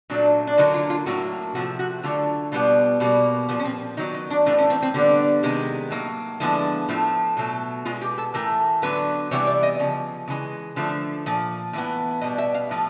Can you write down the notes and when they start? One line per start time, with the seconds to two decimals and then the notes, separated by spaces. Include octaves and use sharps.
0.10 A#2 F#3 A3 D4
0.47 D4
0.58 D3 F#3 A#3 D#4
0.74 F4
0.90 F4
1.06 A2 F#3 A#3 F#4
1.55 C3 F3 A3 F#4
1.79 F#4
2.03 D3 F#3 A3 F4
2.52 B2 G3 B3 F4
3.00 B2 G3 A#3
3.49 A#2 F3 A#3 B3
3.59 C#4
3.65 C4
3.97 D#3 F#3 B3 D#4
4.14 D#4
4.30 D4
4.46 A2 E3 A3 D4
4.59 C#4
4.70 C4
4.83 C4
4.94 D3 G3 B3 C#4
5.43 C3 D#3 G#3 B3
5.91 A2 F#3 A#3 D#4
6.40 D3 F3 G#3 B3 E4
6.89 A2 F3 A3
7.37 B2 F#3 A3
7.85 B2 G#3 B3 F4
8.02 G4
8.18 A4
8.34 A2 E3 A3 A#4
8.82 D3 F#3 B3 B4
9.31 C3 E3 G3 B3 C#5
9.47 D5
9.63 D#5
9.79 C#3 F3
10.28 C#3 E3 G#3
10.76 D3 F3 A3
11.26 A#2 F3
11.73 A2 E3 B3
12.21 B2 G3 B3 D#5
12.38 E5
12.54 F5
12.71 A2 F3